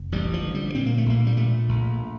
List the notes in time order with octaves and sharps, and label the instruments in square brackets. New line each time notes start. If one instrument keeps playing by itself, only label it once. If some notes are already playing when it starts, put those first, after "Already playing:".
Already playing: [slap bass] F1
A1 G3
F3
D3
G3
A#2 C4
A#3
A3
A#1 A#3
G3
A#2 A3
A#1